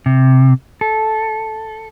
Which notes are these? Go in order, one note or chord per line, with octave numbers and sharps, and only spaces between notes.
C3
A4